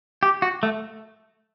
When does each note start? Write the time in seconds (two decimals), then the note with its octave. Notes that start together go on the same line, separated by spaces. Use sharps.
0.23 G4
0.42 F#4
0.63 A3